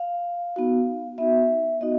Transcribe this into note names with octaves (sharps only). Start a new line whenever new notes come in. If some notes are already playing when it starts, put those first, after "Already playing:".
Already playing: F5
B3 D#4 F#4
B3 D#4 F#4 E5
B3 D#4 F#4 D#5